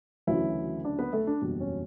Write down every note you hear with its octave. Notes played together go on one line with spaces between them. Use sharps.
D2 C#3 E3 F#3 E4
D4 D5
B3 B4
A3 A4
D4
F#1 E2 B2 G3
C#4